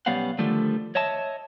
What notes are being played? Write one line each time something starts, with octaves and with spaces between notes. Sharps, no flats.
B1 G3 B3 C#4 F5 F#5
D3 D#3 F3 G3 A3
C#5 D#5 E5 A5